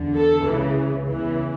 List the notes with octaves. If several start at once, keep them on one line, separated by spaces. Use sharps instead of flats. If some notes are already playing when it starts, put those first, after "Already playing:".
Already playing: E2 D3
A4
C#2 C#3 E3
E2 C#3 E3